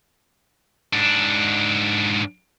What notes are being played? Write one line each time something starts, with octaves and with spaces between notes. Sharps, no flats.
G#2 D4